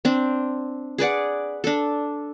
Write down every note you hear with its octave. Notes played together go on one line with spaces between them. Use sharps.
C4 D4
G#4 B4 D5 F#5
D4 A4